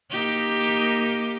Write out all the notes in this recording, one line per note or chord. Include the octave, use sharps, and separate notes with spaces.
A#3 D#4 G4